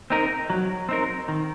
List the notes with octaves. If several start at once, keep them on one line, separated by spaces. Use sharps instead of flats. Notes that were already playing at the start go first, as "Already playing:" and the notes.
C4 D#4 A#4
F#3
C4 D#4 A#4
D#3